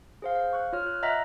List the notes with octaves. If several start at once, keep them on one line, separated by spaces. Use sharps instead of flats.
G#4 C5 F5
F5
C#6 F#6
F4 C#5 F6
F#6
D#5 E5 F#5 A#5 F#6 B6